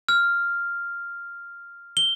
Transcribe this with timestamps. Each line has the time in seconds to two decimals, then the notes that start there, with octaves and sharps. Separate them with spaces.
0.09 F6
1.97 G7